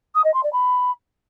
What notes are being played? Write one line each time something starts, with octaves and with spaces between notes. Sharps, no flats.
D#6
D#5
C6
D5
B5